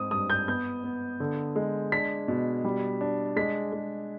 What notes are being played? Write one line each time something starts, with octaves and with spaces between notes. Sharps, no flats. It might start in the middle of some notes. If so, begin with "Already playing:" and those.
Already playing: G#2 C4 D#6
G2 D#6
G6
B3 G6
B3
D3
G#3
D4 B6
B2
G3
D4
G#3 B6
G#3